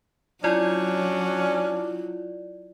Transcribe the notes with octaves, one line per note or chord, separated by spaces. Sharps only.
F#3 C#4 D4 E4 F4 D5